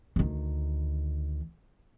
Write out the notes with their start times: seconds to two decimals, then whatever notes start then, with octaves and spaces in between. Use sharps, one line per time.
0.16 D2 D#3